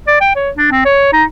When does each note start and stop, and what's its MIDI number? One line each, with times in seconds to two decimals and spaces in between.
0.07 0.20 74
0.21 0.31 79
0.35 0.50 73
0.56 0.69 62
0.71 0.82 60
0.85 1.12 73
1.13 1.24 63